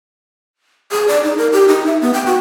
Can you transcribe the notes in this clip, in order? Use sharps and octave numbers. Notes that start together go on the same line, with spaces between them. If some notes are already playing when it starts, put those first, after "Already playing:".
G#4
D5
D#4
A#4
G4
D#4
E5
B3
G5
F#4